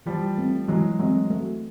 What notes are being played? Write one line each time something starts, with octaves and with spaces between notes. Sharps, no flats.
E3 F3 G3
A3 C4
E3 F#3 G#3
F#3 G#3 A3 C4
A3